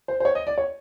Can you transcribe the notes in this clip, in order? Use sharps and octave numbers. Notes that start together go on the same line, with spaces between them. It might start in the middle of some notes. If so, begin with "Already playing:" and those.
C5
C5
C#5
D#5
D5
C#5